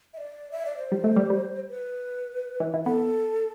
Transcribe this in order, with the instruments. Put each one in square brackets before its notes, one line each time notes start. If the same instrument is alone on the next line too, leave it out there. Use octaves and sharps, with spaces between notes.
[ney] E5
D5
E5
D5
C5
[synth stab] G3
A3
G3
G3
[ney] B4
[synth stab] E3
E3
[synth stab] B3 [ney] A4